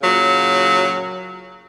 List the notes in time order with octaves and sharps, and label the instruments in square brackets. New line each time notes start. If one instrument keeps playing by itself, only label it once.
[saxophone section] A#2 C#3 F#3